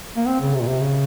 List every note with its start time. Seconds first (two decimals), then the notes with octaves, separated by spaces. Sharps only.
0.17 A#3
0.27 C4
0.41 C#3
0.54 C3
0.61 A#2
0.68 C3
0.81 C#3